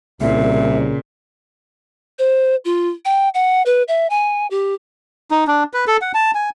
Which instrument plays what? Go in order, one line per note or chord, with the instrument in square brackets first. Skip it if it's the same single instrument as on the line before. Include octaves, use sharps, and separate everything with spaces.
[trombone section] C2 [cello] A#2 [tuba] C#3 [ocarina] E5
[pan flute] C5
F4
G5
F#5
B4
E5
G#5
G4
[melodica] D#4
D4
B4
A4
F#5
A5
G#5